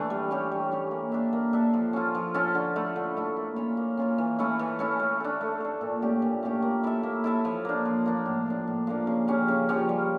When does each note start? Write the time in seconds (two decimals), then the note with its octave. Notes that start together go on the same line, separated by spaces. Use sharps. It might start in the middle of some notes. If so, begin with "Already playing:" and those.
Already playing: E3 A3 D4
0.10 G3
0.31 C#4 G4 C#5
0.52 G3
0.71 C#4 G4 C#5
0.91 A#3
1.12 D4 A4 E5
1.33 A#3
1.53 D4 A4 E5
1.74 F3
1.93 C#4 F4 A4
2.15 F3
2.34 C#4 F4 A4
2.55 D3
2.76 A3 E4
2.96 D3
3.17 A3 E4
3.37 A#3
3.56 C#4 F4 C#5
3.77 A#3
3.97 C#4 F4 C#5
4.18 E3
4.39 A3 C#4 E4
4.59 E3
4.79 A3 C#4 E4
4.99 A3
5.20 D4 A4
5.41 A3
5.60 D4 A4
5.81 A#2
6.02 A3 C#4 G4
6.22 A#2
6.43 A3 C#4 G4
6.62 A#3
6.84 E4 A4 E5
7.03 A#3
7.24 E4 A4 E5
7.45 F3
7.65 A#3 D4
7.85 F3
8.06 A#3 D4
8.26 A2
8.46 F3 A#3 D4
8.67 A2
8.87 F3 A#3 D4
9.07 C#3
9.28 F3 C#4 G4
9.48 C#3
9.69 F3 C#4 G4
9.89 G3